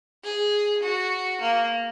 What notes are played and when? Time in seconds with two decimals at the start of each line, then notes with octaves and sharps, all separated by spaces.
0.24 G#4
0.83 F#4
1.41 A#3